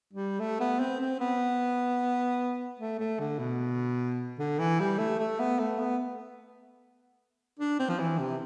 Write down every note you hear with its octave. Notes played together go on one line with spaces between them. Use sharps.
G3
A3
B3
C4
C4
B3
A3
A3
D3
B2
D3
E3
G3
A3
A3
B3
A3
B3
D4
C4
F3
E3
C3